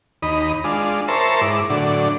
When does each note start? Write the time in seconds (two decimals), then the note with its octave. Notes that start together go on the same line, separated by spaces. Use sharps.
0.22 D#2 D#5 B5
0.64 G#3 D4 F4
1.08 A#4 C5 C#5 E5 A5
1.41 G#2 E4 D6
1.70 A2 D3 F#3 D4